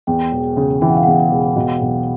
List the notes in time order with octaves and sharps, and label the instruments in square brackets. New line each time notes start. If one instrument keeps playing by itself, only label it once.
[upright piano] E2 [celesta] G5
[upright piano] E1
C#3
[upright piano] E3 [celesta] G5
[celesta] F#5
F5
[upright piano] E2 [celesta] F#5
[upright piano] E1
B2
B1